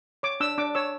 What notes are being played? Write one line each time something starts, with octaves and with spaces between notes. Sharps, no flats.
C#5 D6
D4 E6
D4 D6
C#5 E6